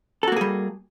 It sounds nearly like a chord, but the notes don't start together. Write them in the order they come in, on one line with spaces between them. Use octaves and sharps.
A4 F#4 A#3 G#4 G3